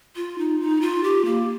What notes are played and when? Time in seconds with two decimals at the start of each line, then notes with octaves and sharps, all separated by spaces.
0.16 F4
0.38 D#4
0.60 D#4
0.81 F4
1.03 G4
1.25 A#3